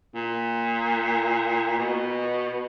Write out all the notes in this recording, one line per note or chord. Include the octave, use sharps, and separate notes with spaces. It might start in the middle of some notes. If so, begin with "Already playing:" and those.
A#2
B2